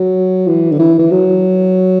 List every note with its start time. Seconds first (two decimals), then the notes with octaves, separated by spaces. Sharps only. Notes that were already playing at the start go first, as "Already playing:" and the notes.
Already playing: F#3
0.47 E3
0.72 D3
0.79 E3
0.99 E3
1.11 F#3